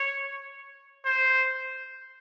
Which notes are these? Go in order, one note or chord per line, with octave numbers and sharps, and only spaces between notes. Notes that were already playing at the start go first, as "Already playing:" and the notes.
Already playing: C#5
C5